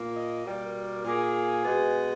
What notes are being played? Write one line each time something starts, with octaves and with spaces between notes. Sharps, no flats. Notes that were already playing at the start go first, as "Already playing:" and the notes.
Already playing: A#2 A#3
D#5
B2 G3 A#3 A#4
A#2 A#3 G#4
B2 G#3 B3